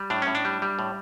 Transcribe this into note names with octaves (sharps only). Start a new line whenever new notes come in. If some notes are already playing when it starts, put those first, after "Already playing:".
Already playing: G3
A2 D4
C#4
A2
D4
G3
G3
A2